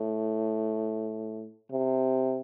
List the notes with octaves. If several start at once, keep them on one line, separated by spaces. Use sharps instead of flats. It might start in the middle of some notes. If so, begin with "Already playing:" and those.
Already playing: A2
C3